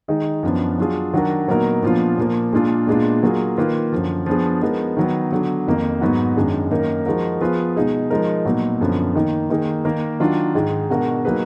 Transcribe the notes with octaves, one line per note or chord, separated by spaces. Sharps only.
D#3 G#3 D#4 G#4
F#2 F3 B3 D4
F#3 D4 F4 G#4
D#3 F#3 D4 F#4 A#4
A#2 F#3 B3 D#4 A#4
A#2 F3 B3 D4 F4
A#2 F3 A#3
A#2 G#3 D4 F4 G#4
A#2 G#3 B3 D4 F4
F#3 A#3 F4 G#4
D#3 A#3 F4 B4
F#2 D3 F3
F3 B3 D4 G#4
F3 G#3 B3 D#4 A#4
D#3 F#3 B3
D3 F#3 B3
F2 D#3 A#3 D#4
G#2 F#3 B3 D#4 F#4
F#2 D#3 G#3 D4
F#2 D#3 A#3 D#4 A#4
F3 G#3 D#4 F#4 A#4
F3 B3 F4 G#4 B4
B2 G#3 D#4 G#4
F3 G#3 D#4 A#4
A#2 F#3 B3 D#4
F#2 D3 F3 B3
D#3 A#3 D#4
D#3 A#3 D#4 G#4
D#3 A#3 D#4 A#4
D#3 F#3 D4 F4
G#2 D#3 G#3
B2 G#3 D4 F#4 A#4
F#3 A#3 D#4 G#4 B4